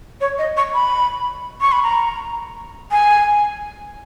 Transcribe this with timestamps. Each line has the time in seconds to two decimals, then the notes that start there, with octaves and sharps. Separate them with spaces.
0.21 C#5
0.38 D#5
0.57 C#6
0.74 B5
1.61 C#6
1.72 B5
1.83 A#5
2.92 G#5